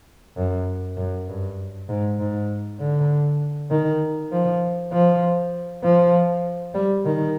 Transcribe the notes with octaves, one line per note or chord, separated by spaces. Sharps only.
F#2
F#2
G2
G#2
G#2
D3
D#3
F3
F3
F3
G3
D#3